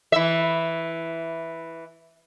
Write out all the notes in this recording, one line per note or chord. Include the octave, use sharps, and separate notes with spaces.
E3 E5